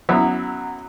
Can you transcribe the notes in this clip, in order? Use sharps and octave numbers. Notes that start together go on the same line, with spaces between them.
F#2 F#3 B3 E4